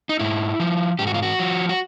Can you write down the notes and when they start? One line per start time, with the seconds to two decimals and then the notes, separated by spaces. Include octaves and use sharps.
0.09 D#4
0.19 G#2 E4
0.60 F3
0.99 G#2 G4
1.07 F#4
1.14 F4
1.22 F#4
1.39 F3
1.69 F#4